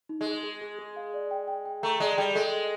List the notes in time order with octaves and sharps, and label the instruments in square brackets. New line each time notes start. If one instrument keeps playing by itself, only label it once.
[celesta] D#4
[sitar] G#3
[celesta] G#4
G#4
G#4
G#4
F5
D5
G5
G5
G5
[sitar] A3 [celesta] A#5
[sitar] G#3 [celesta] D5
[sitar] G3 [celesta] G5
[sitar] G#3 [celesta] A4
[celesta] D#5